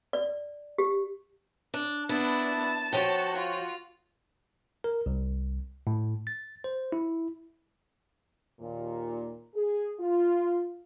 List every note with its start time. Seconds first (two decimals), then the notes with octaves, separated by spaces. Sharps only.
0.13 D5
0.78 G4
1.74 D4
2.09 B3 D4 E4 A5
2.93 F3 F#4 C#5 G5
3.36 F4
4.84 A#4
5.06 C2
5.87 A2
6.27 A6
6.64 C5
6.92 E4
8.60 D#2 A#2
9.55 G#4
9.99 F4